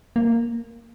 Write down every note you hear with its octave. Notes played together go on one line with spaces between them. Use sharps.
A#3